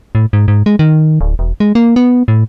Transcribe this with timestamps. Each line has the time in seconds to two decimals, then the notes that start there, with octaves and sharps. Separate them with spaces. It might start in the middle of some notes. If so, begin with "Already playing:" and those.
0.15 A2
0.33 G#2
0.48 G#2
0.66 G#3
0.79 D#3
1.21 D1
1.39 E1
1.60 G#3
1.75 A#3
1.96 B3
2.28 A2